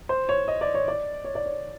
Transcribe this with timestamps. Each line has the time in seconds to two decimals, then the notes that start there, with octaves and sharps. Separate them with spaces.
0.09 C5
0.29 C#5
0.48 D#5
0.61 D5
0.75 C#5
0.88 D5
1.24 C#5
1.35 D5
1.46 C#5